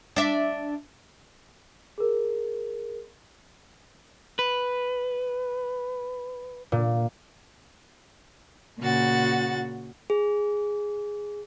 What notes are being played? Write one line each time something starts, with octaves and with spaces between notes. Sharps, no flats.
D4 E5
G#4 A#4
B4
A#2
A#2 C#3 F#4 F#5 A6
G#4